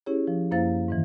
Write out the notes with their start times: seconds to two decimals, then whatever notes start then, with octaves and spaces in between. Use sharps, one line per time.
0.06 C#4 E4 G4 G#4 C#5
0.27 F3
0.51 F#2 A#3 E4 C5 F5 A6
0.88 G#2 D#3 E3